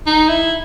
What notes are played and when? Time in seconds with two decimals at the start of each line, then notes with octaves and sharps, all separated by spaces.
0.07 D#4
0.29 E4